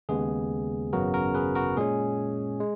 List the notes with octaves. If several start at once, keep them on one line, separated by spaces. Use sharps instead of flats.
D#2 C#3 G#3 B3 G#4
G#1 F#2 C#3 F#3 B3 F#4 A#4
F#4 A#4
G#4 B4
F#4 A#4
A#2 G#3 C#4 G#4
G#3